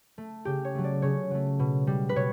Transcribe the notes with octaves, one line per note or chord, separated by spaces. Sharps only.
A3
C#3 G4
C#5
F#3 A3
D5
C#3 C#5
F#3 A3
B2
G3
B4
B2 C#5